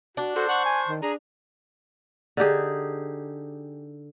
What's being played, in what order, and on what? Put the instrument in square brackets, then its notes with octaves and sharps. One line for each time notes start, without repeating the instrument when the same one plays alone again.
[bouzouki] D4 [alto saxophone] F#4
[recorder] F#4 [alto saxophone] A4 [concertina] C5
[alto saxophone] F#5 [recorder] C#6
[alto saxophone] G#5
D#3
[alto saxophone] D4 [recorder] G#4 [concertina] A#5
[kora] D3 D#4 G4 G#4